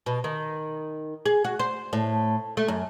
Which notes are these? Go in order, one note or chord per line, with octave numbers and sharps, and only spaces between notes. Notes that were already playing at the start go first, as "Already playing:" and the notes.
B2
D#3
G#4
F#4
C5
A2
A3
F#2